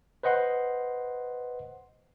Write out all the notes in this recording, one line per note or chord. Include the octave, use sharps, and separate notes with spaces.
B4 C5 D#5 F#5 C6